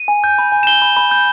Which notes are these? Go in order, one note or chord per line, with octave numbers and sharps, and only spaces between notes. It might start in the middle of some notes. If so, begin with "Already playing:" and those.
Already playing: D#7
G#5
G6
B5
G#5
E7
G6 G7
B5
B5
G6